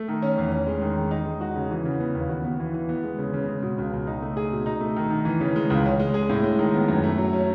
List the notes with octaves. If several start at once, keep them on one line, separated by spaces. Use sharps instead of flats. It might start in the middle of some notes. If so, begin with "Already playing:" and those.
Already playing: A3
D#3
C#4
E2
C#4
G#3
D#3
D#3
D#4
G#3
F#4
C#3
E3
C#3
B3
D#2
F#4
B3
E3
E3
B3
G#3
C#3
C#3
G#3
B2
C#2
C#2
D#4
A3
G#4
B2
D#4
A3
D#3
D#3
E3
C#3
G#3
C#2
C#4
G#3
G#4
A2
G#3
D#3
B3
F#2
A3
F#3
C#4